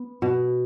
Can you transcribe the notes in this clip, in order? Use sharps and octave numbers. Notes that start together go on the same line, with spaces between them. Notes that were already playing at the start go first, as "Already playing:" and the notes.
Already playing: B3
B2